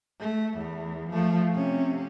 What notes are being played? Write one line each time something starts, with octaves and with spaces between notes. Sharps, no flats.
A3
E2
F3 A3
C3 C#4